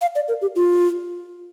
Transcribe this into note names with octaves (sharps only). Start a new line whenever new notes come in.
F5
D5
A#4
G4
F4